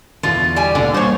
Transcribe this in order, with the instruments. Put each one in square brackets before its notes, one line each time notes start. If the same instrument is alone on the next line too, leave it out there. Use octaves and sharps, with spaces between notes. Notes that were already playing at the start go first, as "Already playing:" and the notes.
[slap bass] E2 B2 D3 [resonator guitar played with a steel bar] F4
[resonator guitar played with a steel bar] G3 G#5
[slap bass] C#2 A#2 [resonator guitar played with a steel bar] D3
[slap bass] G3 A#3 [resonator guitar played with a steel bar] C5 C#5